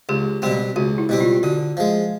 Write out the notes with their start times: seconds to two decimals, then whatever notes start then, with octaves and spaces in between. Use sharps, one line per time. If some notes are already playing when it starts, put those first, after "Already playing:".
0.09 C#2 G4
0.42 B2 G3 C4 G4
0.76 C#2 F#4
0.98 E4
1.09 B2 G3 C4
1.21 F4
1.43 D3 F#4
1.77 F3 G#3